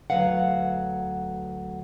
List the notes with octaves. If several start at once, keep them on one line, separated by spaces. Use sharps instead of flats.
D2 D#3 F#3 B4 F5 F#5